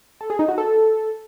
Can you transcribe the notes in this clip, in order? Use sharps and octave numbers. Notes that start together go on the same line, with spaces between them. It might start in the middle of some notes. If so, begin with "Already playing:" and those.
A4
G#4
D#4
F#4
A4